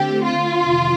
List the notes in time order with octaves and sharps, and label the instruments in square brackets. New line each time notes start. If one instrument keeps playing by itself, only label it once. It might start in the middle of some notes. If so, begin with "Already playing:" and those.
Already playing: [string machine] D3 A3 C4 [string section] G4
[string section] F4
[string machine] F2 C3 D#3